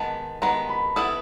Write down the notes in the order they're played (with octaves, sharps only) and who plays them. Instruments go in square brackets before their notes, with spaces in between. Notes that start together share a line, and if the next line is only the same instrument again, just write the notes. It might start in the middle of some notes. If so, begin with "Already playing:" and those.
Already playing: [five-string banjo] D#3 G#3 B3 [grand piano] A5
[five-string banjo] D#3 G#3 B3 [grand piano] A#5
[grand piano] B5
[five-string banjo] B3 E4 A4 [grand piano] D#6